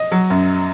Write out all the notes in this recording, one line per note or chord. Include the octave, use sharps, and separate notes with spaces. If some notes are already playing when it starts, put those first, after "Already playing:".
Already playing: D#5
F#3
F#2